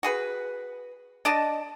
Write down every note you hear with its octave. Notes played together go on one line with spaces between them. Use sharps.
F#4 G#4 B4
D4 D5 D#5 A5